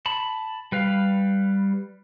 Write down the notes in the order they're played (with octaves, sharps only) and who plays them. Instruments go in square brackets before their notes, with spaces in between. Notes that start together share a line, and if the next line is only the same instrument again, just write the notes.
[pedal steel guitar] A5 B5
G3 B4 F5